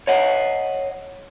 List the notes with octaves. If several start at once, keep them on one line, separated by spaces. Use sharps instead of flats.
C#5 D#5 F#5